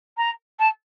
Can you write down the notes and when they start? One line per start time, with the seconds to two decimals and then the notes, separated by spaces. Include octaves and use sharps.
0.17 A#5
0.59 A5